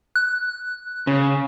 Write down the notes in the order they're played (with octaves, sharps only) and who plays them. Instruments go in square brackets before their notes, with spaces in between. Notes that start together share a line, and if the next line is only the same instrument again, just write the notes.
[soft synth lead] F#6
[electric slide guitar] C#3